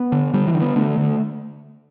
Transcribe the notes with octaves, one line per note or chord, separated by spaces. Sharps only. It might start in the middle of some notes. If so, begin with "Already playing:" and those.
Already playing: B3
D3
D3 G3
E3
D3
B3
D3 A3
D3